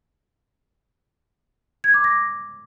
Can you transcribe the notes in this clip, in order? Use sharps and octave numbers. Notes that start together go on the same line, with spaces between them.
G#6
D6
A#6